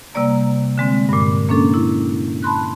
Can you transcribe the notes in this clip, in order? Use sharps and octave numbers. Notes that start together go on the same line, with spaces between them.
C3 G3 A#3 D5 A#5
D3 G#3 C4
G2 A#2
A#3 C#4 D4 A4
E4
A5 B5 C6 F#6